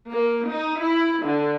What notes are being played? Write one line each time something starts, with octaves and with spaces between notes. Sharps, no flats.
A#3
D#4
E4
D3